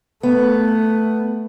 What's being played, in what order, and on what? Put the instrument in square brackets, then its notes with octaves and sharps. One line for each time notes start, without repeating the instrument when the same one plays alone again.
[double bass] A3 [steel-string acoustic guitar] B3